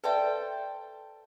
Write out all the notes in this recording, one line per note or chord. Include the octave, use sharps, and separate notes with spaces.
A4 B4 C5 D5 E5 G5